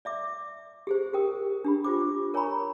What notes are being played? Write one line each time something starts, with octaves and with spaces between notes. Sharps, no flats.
D5 E5 D6
G4 G#4 C5
G4 G#4 A#4 G5 D#6
D4 G4 B5
F4 G4 C5 D6
A#4 C#5 G#5 A#5 B5 C#6